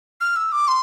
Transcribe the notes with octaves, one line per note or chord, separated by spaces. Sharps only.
F6
E6
D6
C6